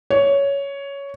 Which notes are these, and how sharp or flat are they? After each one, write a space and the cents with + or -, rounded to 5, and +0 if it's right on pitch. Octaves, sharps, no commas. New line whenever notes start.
C#5 +10